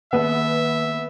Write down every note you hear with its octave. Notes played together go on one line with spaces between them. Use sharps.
D#3 A#3 B3 E5